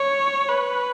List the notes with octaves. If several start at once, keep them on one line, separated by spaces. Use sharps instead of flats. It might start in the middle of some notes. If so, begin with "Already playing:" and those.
Already playing: C#5
B4